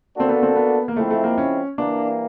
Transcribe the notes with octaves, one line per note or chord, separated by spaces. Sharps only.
A#3 C4 D4 F#4 A4
B3
C4
B3
A#3
F3 G#3 A3 C4 E4
A3
A#3
C#4
E3 G3 A#3 D4